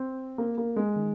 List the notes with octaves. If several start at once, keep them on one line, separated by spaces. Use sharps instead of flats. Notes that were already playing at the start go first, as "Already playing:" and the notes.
Already playing: C4
A#3
A#3
G#3
D#3